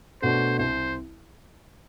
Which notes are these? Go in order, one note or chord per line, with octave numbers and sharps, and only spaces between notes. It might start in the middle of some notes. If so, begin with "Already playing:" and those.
B2 A3 D4 F#4 C5
C2 C5